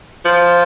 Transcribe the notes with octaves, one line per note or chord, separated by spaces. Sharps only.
F3